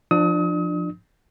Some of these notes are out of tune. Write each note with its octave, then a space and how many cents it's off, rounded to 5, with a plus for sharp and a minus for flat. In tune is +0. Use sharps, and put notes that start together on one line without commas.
F3 +0 D4 +30 D#6 +35